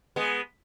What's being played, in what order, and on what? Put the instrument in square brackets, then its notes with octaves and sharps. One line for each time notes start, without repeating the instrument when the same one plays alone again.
[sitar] G#3 B3